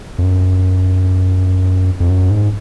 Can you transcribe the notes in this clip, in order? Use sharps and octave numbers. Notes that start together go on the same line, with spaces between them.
F2
F#2
F2
F#2
G#2